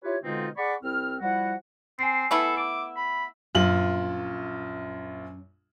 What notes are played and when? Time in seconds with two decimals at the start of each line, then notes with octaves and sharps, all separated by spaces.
0.04 E4 F4 G4 B4 C#5
0.23 B2 D3 G#3 C4 D#4 F4
0.57 G#4 D5 F#5 B5 C#6 D6
0.83 C2 C4 E4 F6
1.21 F3 G3 E4 F#4 F#5
1.99 C4 G#5 C7
2.31 A3 B3 E4 A4
2.57 D6 E6
2.96 B5
3.55 A#1 F#2 F4 F#7